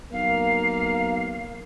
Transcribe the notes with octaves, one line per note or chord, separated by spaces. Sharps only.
B1 A#3 F5